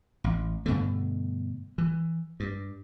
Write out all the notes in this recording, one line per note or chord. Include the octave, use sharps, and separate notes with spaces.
A1
G2 B2 D3 A3
E3
G2